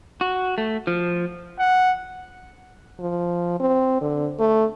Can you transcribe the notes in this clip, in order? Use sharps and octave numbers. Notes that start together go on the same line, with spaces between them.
F#4
A3
F3
F#5
F3
C4
D3
A3